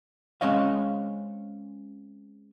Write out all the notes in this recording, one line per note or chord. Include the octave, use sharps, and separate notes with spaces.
G#3 C4 C#4 C#5 D#5 F5